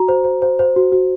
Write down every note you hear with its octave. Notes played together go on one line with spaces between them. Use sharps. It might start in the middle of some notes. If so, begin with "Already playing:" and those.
Already playing: F#4 A#5
C5
C5
C5
C5
F#4
F#4